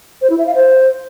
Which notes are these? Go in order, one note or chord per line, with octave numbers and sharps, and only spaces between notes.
C5
E4
E5
F5
C5